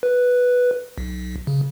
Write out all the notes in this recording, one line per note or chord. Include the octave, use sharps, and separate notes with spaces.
B4
B1
C#3